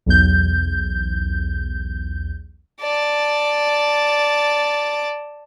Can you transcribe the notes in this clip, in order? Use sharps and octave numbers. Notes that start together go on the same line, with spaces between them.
B1 E2 G6
D5 A5